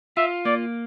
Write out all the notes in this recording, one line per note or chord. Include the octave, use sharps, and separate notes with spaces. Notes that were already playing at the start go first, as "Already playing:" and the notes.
F4 E5
A#3 D5